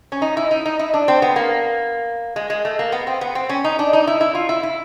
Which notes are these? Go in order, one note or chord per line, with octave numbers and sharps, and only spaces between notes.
C#4
D#4
E4
D#4
D#4
E4
D4
C4
B3
A#3
G#3
G#3
A3
A#3
B3
C4
B3
C4
C#4
D#4
D4
D#4
E4
E4
F4
E4
E4